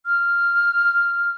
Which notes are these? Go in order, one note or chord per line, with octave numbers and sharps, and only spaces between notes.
F6